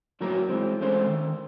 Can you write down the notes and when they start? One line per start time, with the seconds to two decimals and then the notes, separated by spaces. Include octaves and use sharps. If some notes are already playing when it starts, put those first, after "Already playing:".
0.21 F2 A2 F#3 A#3 A#4
0.49 E3 G#3 C4
0.81 G#3 A3 C4 C#4 C5
1.07 D#3